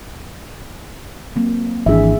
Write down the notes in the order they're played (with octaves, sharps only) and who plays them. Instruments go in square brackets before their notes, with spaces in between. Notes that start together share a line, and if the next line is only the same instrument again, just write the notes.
[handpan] F#3 A#3 C4
[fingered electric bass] G#1 E3 D4 [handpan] G#4 E5